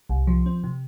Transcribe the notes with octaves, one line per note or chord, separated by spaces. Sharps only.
C2
F3
C4
C3